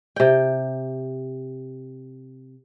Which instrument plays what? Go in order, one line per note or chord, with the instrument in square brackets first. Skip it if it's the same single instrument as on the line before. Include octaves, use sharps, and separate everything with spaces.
[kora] C3 G5